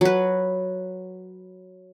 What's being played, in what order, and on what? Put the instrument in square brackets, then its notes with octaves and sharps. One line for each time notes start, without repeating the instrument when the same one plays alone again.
[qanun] F#3 B4